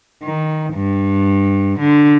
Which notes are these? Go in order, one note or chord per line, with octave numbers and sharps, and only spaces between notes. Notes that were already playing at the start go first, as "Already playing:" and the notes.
D#3
G2
D3